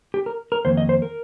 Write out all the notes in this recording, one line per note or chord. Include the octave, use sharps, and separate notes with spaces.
G4
A#4
A#4
F2 D#3 A#3 C5
D#5
C5
A#4